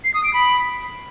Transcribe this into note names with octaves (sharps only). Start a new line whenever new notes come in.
C7
D#6
D7
B5